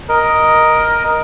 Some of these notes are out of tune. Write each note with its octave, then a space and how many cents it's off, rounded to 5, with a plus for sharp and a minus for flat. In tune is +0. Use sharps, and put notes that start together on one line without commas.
A#4 +10 D#5 +0